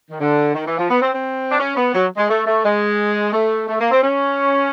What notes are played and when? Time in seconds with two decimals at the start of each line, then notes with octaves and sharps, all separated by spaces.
0.11 D#3
0.20 D3
0.55 D#3
0.66 E3
0.78 F3
0.89 B3
1.01 C4
1.13 C4
1.51 D4
1.60 C#4
1.76 B3
1.94 F#3
2.17 G#3
2.29 A3
2.46 A3
2.64 G#3
3.33 A3
3.68 A3
3.79 A#3
3.91 C4
4.02 C#4